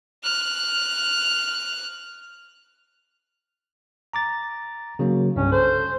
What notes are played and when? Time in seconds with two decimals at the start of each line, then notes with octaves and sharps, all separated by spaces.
0.24 F6 F#6
4.13 A#5 D6 A6
4.99 C#3 F#3 A#3
5.36 C2 G2 C#4
5.52 A4 C5